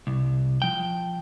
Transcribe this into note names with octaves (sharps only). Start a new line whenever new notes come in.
C2
F3 G5